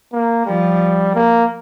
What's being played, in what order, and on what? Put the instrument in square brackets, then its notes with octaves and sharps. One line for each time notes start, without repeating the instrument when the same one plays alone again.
[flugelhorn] A#3
[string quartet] F3 [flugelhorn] G3
[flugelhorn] A#3